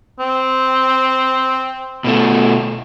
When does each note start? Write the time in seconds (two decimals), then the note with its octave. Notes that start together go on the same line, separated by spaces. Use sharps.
0.20 C4
2.04 B2 A3